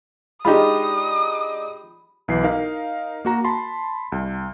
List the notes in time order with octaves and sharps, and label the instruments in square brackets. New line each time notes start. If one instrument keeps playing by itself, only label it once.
[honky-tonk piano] G#3 D4 D#4 [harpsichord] F4 G4 [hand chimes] B5 [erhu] D#6
[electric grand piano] B1 E3 C7
D#4 A#4 F5
A#3 F#4 A#5
A5 B5 C6
C2